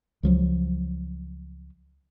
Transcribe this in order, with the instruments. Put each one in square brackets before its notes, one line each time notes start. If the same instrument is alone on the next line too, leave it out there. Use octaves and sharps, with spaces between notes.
[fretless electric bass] C#2 F3 F#3